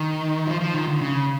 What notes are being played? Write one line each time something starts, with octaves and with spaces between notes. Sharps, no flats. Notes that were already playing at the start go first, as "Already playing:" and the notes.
Already playing: D#3
F3
F3
D#3
D3
C#3